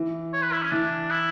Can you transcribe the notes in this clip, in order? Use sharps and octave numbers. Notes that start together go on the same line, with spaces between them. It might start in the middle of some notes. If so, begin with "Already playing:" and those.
Already playing: E3
C#5
B4
E4
C#4
E3 D4
E4